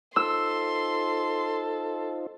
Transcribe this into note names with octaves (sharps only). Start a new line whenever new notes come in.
D#4 F4 A4 C5 C6 E6